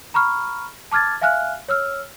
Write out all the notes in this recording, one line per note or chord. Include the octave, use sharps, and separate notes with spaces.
A#5 B5 C#6 F6
A5 D6 F6 G#6 A6
E5 F5 G#5 F6 F#6
C#5 E6 F6